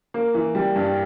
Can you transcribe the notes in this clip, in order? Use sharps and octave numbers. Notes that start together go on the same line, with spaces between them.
A#3
E3
G3
G2